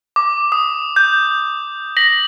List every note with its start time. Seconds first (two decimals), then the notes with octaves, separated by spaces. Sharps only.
0.16 D6
0.52 D#6
0.96 G6
1.97 A#6 B6 F#7